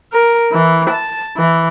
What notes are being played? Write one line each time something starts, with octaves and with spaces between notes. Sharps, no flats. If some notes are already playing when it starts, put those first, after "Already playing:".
A#4
E3
A5
E3